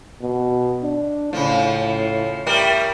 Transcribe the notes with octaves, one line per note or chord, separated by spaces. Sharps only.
B2
D4
A2 C#3 F3
A2 G3 A#4